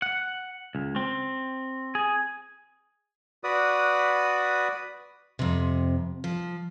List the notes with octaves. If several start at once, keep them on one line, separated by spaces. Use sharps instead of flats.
F#5
C#2
C4
G#4
F#4 B4 D5 D#6
F2 C3
F3